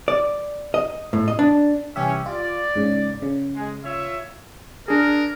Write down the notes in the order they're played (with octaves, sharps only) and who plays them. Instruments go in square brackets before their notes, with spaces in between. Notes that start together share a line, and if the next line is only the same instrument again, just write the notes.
[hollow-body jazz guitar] D5
D#5
A2
D#5
D4
[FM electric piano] C2 G4 E5 [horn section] E3 C#4
[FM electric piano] F4 [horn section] D5
[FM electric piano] G#2 C#3
C#3
[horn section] G#3
F4 C#5 E5
[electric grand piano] D4 G#4 [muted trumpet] A#4